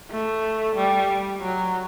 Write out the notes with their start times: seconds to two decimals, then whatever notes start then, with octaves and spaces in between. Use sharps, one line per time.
0.11 A3
0.76 G3
1.41 F#3